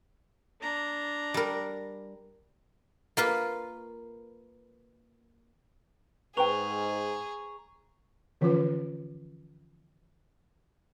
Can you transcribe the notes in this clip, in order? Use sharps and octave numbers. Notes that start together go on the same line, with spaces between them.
D4 A#5
G3 A#4
A#3 F4 B4
G#2 G#4 B4 G5 A#5 C#6 F7
D3 E3 F3 C#4 F4 B4